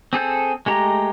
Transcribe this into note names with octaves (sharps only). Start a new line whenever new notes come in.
C4 G#4 A4 G6
G#3 A3 G4 A#5